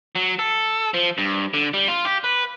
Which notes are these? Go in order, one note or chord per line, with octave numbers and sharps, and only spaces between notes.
F#3
A4
F3
G2
D3
G3
F4
G4
B4